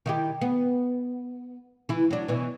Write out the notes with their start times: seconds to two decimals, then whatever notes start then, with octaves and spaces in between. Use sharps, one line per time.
0.06 D#3 E4 G4
0.41 B3
1.89 E3 E4
2.11 F#3 D4
2.28 B2 E3